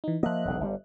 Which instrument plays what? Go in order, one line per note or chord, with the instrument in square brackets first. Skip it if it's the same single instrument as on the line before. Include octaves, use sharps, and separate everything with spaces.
[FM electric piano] E3 D#4
[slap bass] F3 A#3 [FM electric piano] D#5 E5 F#6
[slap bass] E1 B1 C#3
G1 A#2 G3